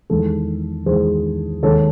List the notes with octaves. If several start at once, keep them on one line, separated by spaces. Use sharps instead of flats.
E2 D#3 G#3 A4
E2 D#3 G#3 G#4 C5
D#2 D#3 G#3 A4 C#5